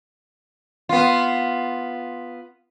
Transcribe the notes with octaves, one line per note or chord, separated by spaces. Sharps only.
B3 F4